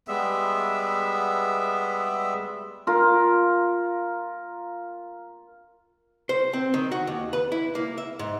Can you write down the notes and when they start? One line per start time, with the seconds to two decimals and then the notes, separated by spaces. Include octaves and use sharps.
0.08 G3 G#3 B3 E5
2.87 F4 A#4
6.29 C5
6.53 C4
6.74 D#3
6.92 F#4
7.07 D#2
7.33 B4
7.52 E4
7.75 A#3
7.98 E5
8.19 G#2